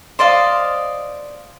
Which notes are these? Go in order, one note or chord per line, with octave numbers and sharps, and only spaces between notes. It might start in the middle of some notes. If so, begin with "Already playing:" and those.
C5 D5 D#5 F5